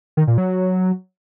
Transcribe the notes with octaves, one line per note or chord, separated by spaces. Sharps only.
D#3
A#2
F#3